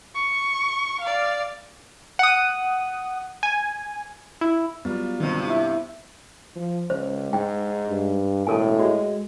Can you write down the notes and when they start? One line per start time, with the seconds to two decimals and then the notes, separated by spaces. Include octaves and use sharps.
0.15 C#6
1.01 D5 F5
2.19 F#5 D#6
3.43 G#5
4.41 E4
4.85 F#3 G3 B3 F4
5.20 G2 C3 D#3
5.47 E4 E5
6.56 F3
6.90 C#2 C5
7.33 G#2 G5
7.88 G2
8.47 E1 A2 A4 A#4 G#5
8.79 G#3 F#4